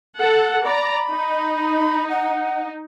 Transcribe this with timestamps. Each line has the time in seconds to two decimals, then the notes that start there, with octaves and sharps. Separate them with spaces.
0.18 A4 F#5
0.64 D5 A#5 B5
1.10 D#4
2.10 F#5